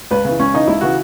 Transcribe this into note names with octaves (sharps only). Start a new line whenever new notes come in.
C#2 B4
C#3 E3
C#2 C#4
C#3 E3 D#4
C#2 E4
C#3 E3 F#4